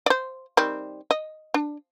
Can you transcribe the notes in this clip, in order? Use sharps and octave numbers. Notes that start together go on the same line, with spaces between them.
C5 D5
D#3 G3 C4
D#5
D4